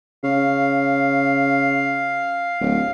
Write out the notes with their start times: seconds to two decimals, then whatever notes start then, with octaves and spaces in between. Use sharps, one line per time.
0.24 C#3 F5
2.61 D1